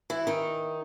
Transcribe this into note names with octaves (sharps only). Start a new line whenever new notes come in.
E3 E4
D#3 D#4